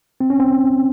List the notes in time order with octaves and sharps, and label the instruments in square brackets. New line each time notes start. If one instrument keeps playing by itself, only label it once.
[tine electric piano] C4
C#4
C4